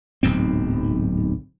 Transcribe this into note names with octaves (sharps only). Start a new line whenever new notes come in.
D1 B1 G#2 C4